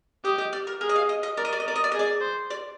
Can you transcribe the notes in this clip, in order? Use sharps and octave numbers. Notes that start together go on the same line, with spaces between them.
G4 D#5
D#5
D5
A#4
G#4 A#4
D#5
F5
D#5
D#5
A#4 D5
D#5
D5
D#5
A#4 D5
D#5
D5
G#4 D#5
D5
C5
D5